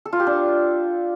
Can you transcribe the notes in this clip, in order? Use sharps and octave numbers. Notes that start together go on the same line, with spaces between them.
A4
F4
G4
D4